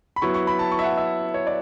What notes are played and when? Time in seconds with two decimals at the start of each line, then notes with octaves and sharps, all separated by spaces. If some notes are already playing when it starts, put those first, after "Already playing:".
0.16 B5
0.22 F#3 B3 E4 C#6
0.34 C#6
0.47 B5
0.59 A5
0.72 C#6
0.79 E5
0.84 F#5
0.97 E5
1.34 C#5
1.47 D5